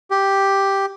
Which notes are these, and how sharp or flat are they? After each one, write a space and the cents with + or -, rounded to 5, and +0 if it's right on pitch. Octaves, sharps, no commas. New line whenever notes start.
G4 +0